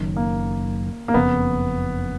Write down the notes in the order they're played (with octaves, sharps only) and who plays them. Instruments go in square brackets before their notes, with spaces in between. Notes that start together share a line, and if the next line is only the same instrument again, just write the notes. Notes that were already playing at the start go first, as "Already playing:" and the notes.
Already playing: [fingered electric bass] F#1 F#2 D#3
[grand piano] A#3
A#3
[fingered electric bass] F#1 F2 C#3 [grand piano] B3